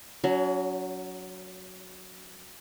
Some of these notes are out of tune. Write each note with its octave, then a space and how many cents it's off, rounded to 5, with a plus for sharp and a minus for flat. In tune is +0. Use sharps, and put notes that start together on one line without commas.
F#3 +0 C#4 +40